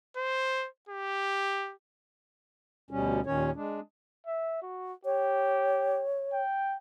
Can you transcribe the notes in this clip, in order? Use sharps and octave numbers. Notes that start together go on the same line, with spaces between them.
C5
G4
D2 B2 G3 C#4
D#2 A#2 D#3 C#4 C#5
G#3 D4
E5
F#4
G4 C#5
G5